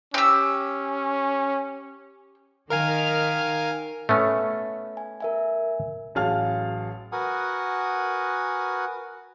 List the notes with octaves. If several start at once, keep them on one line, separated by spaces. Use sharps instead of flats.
C#4 G4 E6
D#3 A#4 F5 G#5 F6
A3 B3 C#4
G#5
A#4 E5 G#5
A1 F#3 G#4 F5 A5 F6
F#4 A#4 B4 F#5 G#5 D#6